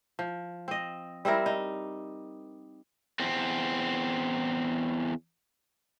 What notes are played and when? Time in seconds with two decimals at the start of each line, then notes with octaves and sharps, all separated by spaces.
0.19 F3
0.68 C4 D#5
1.25 G3 C4 E4 A#4
1.46 D#4
3.20 E2 C4